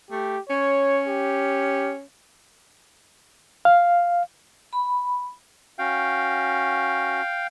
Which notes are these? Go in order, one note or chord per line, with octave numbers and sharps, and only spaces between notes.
A3 G4
C#4 C#5
G4
F5
B5
C#4 F#4 F5 G5